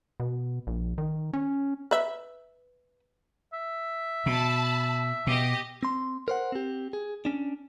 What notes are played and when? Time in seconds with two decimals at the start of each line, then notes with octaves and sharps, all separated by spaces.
0.20 B2
0.67 A#1
0.98 D#3
1.33 C#4
1.91 B4 E5
3.53 E5
4.26 B2 A5 B5
5.27 B2 G4 D#5
5.83 C4 C6
6.28 A#4 C5 F#5
6.52 C4 G4
6.93 G#4
7.25 C#4 D4